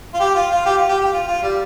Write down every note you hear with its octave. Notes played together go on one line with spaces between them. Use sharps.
F4
G4
F4
F4
G4
F4
G4
G4
F4
F4
G3